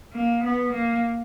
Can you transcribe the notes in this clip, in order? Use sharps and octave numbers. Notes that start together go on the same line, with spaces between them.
A#3
B3
A#3